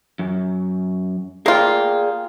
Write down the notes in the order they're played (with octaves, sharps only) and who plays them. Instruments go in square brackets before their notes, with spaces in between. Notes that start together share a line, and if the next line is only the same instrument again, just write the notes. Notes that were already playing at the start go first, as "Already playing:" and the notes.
[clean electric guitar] F#2
[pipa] A#3 F4 [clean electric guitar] G#4 D5 G5